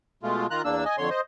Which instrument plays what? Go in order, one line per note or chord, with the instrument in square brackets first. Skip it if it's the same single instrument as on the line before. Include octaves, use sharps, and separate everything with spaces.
[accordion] B2 G#3 A3 F4
D#3 F4 A#5 F#6
E2 A#3 D4 E6
D#5 G#5
F2 D3 C#5 C6
C5 D#5